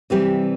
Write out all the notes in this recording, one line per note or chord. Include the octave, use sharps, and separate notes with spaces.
C3 E3 G3 C4 G4